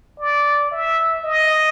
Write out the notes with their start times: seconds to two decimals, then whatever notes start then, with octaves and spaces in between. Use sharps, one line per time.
0.20 D5
0.71 E5
1.24 D#5